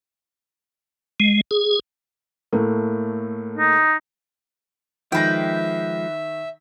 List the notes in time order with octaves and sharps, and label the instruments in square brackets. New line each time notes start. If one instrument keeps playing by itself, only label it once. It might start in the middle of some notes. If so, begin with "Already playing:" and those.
[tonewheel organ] G#3
G#4
[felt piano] A2 A3 A#3
[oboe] D#4
[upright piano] D#3 A#6 [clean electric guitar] F3 G#3 [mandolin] B4 G5 [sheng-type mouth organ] E5